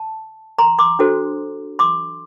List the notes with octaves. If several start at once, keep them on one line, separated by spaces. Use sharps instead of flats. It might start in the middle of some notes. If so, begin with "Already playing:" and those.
Already playing: A5
A#5 C6
C6 D6
D4 F#4 A4 C5
C6 D6